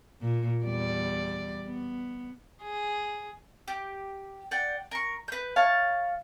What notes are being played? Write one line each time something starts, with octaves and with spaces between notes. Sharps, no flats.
A#2
E2 G3 D5
B3
G#4
G4
D5 F#5 G5
A#4 C#6
B4 G6
C#5 F5 A5